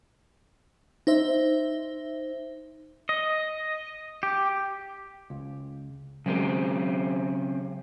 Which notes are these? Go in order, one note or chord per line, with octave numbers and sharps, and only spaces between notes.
D#4 C5 E5
D#5
G4
C#2
C#3 F#3 G#3 C4 A#4